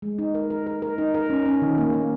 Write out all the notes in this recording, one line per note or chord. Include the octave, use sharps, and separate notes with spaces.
G#3
D#4
A#4
A#4
A#4
A#4
D#4
A#4
C#4
C#4
D#3
A#3
A#3